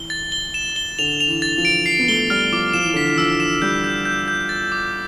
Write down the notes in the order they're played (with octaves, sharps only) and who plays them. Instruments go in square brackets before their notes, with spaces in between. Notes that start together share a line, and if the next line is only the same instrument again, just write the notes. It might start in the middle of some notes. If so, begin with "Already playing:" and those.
Already playing: [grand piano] E3 [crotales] G7
[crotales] A6
G7
E7
G7
[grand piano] D3 [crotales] F7
[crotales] F7
[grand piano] E3
[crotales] A6
[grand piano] F3
[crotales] D7
C7
[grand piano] B3
[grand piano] A3 [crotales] G7
[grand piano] G3 [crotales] F6
[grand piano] F3 [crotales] D6
[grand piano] F3 [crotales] E7
[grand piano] E3
[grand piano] D3 [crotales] B6
[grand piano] E3
[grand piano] F3 [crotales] E6
[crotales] E7
[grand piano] G3 [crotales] G6
[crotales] G6
G6
G6
A6
D6